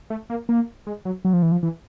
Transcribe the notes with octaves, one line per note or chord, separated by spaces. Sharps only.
A3
A#3
A#3
G#3
F#3
F#3
F3
E3
F3
E3